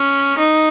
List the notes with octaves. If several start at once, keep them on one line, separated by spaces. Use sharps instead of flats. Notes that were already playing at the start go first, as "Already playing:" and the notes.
Already playing: C#4
D#4